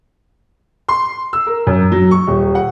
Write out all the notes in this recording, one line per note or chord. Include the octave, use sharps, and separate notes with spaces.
C6
E6
A#4
F#2
F#3
C#6
D#1
F#5